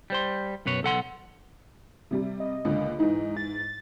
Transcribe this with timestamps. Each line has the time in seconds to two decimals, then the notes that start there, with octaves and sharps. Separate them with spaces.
0.10 G3 C5 C6
0.66 F#2 B2 B4 C#5
0.83 B1 A4 F#5 C6
2.11 C3 G3
2.40 D#5
2.65 C#2 A#2 D3
2.99 G#2 E3 D#4
3.37 A6